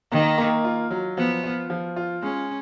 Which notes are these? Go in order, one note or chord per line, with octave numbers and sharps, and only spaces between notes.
D#3 A#3
A#3
F4
F#3
F3 B3
F4
F3
F4
G#3 C#4